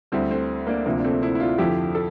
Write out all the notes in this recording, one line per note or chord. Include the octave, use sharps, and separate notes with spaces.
D2 D3 G3 C4 E4
A3 C4
A#3 D4
D2 C3 F3 A#3
D4
A3 C4
C4 E4
E4
D4 F4
F2 D3 F3 E4 G4
A4